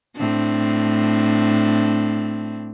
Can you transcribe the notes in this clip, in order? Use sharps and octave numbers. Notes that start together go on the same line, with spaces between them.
A2 C4 D4